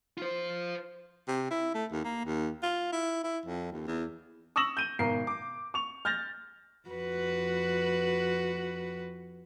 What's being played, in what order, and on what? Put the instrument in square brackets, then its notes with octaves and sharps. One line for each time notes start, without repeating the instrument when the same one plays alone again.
[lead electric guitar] F4 C5
[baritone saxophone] C3
E4
A3
D#2
A#3
D#2
F4
E4
E4
F2
D#2
E2
[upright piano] C#6 D#6 E6 A#6 E7 F#7
G6 D#7 G7
G#1 B2 A#4 C7
D6
C#6 F7
F6 G6 A6 A#6 F7
[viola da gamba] F2 F#4 B4